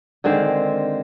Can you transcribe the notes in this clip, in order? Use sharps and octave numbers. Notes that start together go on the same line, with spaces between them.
D3 D#3 G#3 C4